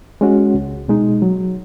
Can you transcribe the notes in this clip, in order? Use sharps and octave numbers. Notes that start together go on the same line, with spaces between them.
G#3 C#4 F#4
C#2
B2 G#3 D#4
F#3